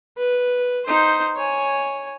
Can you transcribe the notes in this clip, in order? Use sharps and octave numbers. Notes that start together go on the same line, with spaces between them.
B4
D#4 C5
C#5 G#5